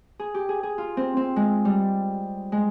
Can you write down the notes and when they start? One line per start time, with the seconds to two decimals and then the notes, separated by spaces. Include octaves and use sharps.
0.19 G#4
0.34 G4
0.49 G#4
0.63 G#4
0.78 F4
0.97 C4
1.17 C4
1.36 G#3
1.65 G3
2.52 G#3